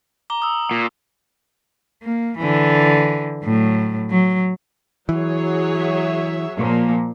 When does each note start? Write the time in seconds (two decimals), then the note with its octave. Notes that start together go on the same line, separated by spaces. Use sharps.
0.30 A#5 D6 G7
0.42 D#6 E6
0.71 A#2
2.03 A#3
2.38 D3 E3
3.44 A2 F#3
4.11 F#3
5.09 E3 F#3 G#4 C#5
5.76 E5
6.58 A#2 F3 A#3